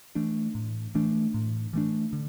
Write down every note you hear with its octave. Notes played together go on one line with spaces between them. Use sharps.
E3 A3 D4
A2
E3 A3 D4
A2
E3 A3 D4
D3